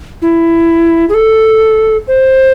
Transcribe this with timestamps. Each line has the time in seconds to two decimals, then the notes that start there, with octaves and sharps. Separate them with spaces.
0.22 E4
1.09 G#4
1.14 A4
2.08 C5